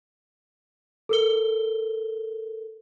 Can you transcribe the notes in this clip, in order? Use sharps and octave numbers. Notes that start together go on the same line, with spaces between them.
A4 A#4 G7